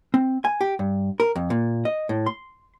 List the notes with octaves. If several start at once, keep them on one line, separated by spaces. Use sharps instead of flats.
C4
G#5
G4
G2
A#4
F2
A#2
D#5
A2
C6